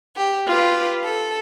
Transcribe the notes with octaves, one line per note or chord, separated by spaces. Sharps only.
G4
F4 G4 B4
A4